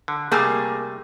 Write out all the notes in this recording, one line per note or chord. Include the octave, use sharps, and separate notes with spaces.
D3
C3 G3 A3 A#3 G#4